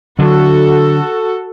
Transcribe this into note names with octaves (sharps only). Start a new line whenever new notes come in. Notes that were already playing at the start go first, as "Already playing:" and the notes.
D3 F#3 D4 F#4 A4